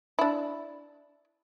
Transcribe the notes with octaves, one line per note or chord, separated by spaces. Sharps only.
D4 E4